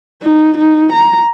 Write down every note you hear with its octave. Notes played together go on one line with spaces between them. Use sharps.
D#4
D#4
A#5